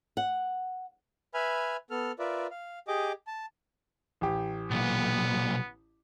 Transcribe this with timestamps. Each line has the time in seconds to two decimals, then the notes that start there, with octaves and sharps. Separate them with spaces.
0.17 F#5
1.34 B4 E5 G#5 B5 F6
1.90 B3 A4 F6
2.19 F4 A#4 B4 D5 E5
2.51 F5
2.88 G4 G#4 D#5 D6
3.27 A5
4.21 A1 G4
4.71 B1 A#2 B3